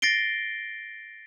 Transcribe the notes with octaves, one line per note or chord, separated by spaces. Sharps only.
A6 A#6 C7 D7 G7